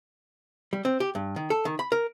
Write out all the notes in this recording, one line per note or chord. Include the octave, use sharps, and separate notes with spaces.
G3
C4
G4
G2
D#3
A4
D#3
B5
A#4